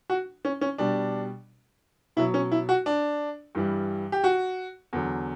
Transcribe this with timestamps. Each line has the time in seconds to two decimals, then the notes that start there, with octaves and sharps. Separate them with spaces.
0.10 F#4
0.45 C#4
0.61 C#4
0.78 B2 G3 D4
2.17 B2 F#3 E4
2.34 C#4
2.52 E4
2.69 F#4
2.86 D4
3.55 G2 E3 G3
4.12 G4
4.24 F#4
4.93 E2 D3 F#3